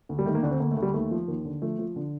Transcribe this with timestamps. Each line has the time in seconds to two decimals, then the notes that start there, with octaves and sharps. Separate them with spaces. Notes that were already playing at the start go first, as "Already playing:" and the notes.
0.09 D2
0.19 G3
0.26 D#3 A3
0.35 A#3
0.43 D2 D4
0.51 C4
0.60 D2 A#3
0.71 A3
0.77 D2
0.83 G3
0.94 D#2 A3
1.11 F3
1.28 D#2
1.45 D3
1.62 F3 A3
1.79 F3
1.96 D3